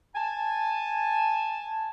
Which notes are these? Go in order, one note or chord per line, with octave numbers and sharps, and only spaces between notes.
G#5 A5